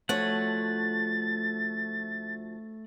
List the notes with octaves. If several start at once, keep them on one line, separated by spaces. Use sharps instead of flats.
D2 F3 A3 C#5 F#5 A6